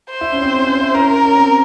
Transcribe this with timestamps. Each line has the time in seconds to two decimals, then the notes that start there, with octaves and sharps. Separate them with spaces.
0.10 C5
0.21 E4
0.32 C#4
0.43 C4
0.53 C#4
0.66 C#4
0.81 E4
0.94 C#4 A#4
1.25 C#4
1.36 C4